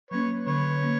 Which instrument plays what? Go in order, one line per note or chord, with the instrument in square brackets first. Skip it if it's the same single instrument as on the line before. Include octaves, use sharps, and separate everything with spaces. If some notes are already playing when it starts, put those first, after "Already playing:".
[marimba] F#3 A#3 C#4 [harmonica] B4 C#5
[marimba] D3 [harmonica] B4 C#5
[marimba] F#3 A#3 C#4